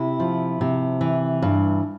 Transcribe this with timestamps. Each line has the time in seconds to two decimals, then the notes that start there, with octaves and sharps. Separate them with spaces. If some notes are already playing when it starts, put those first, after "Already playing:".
Already playing: C3 E4
0.20 F3
0.61 C3
1.01 E3
1.42 G2